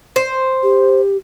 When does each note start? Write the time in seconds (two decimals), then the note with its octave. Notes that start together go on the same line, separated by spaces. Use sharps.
0.16 C5
0.63 G4